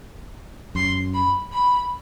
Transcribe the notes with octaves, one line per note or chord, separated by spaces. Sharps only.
F#2 C6
B5
B5